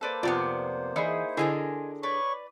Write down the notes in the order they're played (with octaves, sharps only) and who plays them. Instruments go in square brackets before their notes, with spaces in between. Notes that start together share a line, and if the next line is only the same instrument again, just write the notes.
[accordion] A#3 C5 [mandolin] A4 B4 D5
[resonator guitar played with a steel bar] F2 C3 B3 [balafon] F4 [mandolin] D5
[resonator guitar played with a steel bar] E3 [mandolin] D#4 E4 G#4 [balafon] D5
[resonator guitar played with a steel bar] D3 G#4 A#4 [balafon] E4 [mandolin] D#5 G#5 C6
[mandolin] B4 D5 [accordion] C#5 C#6